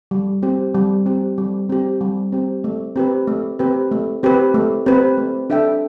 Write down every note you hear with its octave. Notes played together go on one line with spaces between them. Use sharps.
G3
C4 G4
G3
C4 G4
G3
C4 G4
G3
C4 G4
A3
C4 G4 B4
A3
C4 G4 B4
A3
C4 G4 B4
A3
C4 G4 B4
A3
D4 A4 E5 G5